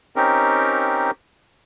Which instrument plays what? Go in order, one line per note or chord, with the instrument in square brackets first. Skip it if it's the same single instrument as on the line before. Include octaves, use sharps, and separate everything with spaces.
[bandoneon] C4 C#4 D#4 G4 A#4